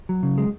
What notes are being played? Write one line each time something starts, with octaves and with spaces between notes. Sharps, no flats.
F#3
C#3
G#3